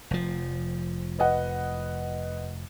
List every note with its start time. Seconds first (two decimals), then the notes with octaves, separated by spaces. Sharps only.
0.11 F1 F3
1.19 B4 D#5 F#5